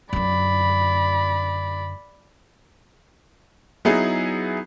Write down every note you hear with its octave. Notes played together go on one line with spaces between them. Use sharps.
F#2 D3 D5 B5
F#3 B3 D#4 E4 G#4